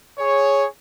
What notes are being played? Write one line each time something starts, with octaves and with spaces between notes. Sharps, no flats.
G#4 C#5